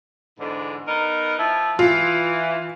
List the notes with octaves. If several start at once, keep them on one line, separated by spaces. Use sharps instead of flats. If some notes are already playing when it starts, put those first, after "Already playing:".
E2 G#2 D3
B3 D#4 A#4
F3 E4
E3 F4